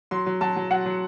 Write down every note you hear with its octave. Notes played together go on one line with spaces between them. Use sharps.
F#3 C6
F#3
F#3 A5
F#3
F#3 F#5
F#3